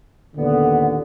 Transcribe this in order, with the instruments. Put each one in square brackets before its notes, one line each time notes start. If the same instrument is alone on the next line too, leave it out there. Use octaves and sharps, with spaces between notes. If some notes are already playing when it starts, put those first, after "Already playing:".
[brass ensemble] D#2 A#2 D3 [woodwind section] B3